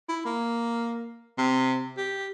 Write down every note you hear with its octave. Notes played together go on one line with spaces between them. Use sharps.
E4
A#3
C3
G4